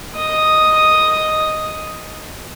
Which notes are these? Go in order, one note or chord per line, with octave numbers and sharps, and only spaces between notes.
D#5 D#6